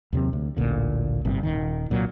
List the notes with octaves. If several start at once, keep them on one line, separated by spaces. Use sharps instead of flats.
D#2 C3 F#3 C4
D2
A1 D2 A#2 D3
G#1 G2 C3
D#1 D#3
C2 A#2 F#3